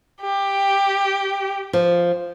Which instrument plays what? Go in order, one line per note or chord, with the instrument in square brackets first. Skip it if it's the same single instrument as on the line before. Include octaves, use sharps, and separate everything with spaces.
[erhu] G4
[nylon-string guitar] F3